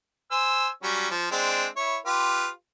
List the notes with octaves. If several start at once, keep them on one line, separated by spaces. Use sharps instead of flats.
C5 G#5 E6
F#3 G3 C#4
F3
G#3 C4 D4
E4 C#5
F4 G4 B4